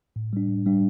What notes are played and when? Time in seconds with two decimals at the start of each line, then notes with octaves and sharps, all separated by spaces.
0.16 A2
0.33 G3 D4
0.49 A2
0.66 G3 D4